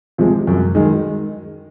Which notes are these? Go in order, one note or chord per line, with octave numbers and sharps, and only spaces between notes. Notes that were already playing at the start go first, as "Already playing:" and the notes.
C3 F3 G#3
F#2
D#3 G#3